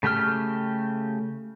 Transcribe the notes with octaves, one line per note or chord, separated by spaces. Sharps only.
C#3 A3 G4 G5 F6